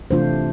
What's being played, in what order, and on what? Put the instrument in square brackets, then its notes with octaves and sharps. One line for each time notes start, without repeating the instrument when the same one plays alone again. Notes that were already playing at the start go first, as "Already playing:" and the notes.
[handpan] C3 E3 A3 D4 F4 C5